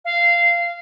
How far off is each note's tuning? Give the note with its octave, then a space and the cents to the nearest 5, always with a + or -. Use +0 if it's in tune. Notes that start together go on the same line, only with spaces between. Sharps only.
F5 -15